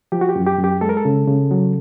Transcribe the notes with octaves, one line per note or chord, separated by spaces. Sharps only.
F3 G4
F#4
G4
F#2
G4
F#2
G4
G#3 A4
A#4
A4
C#3
C#3
F#3